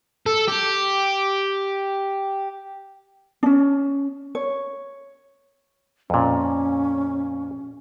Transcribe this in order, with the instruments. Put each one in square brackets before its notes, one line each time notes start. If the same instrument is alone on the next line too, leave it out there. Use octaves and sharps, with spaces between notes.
[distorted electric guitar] A4
G4
[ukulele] C#4 D4
C#5
[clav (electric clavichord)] F2 A#2 [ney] C#4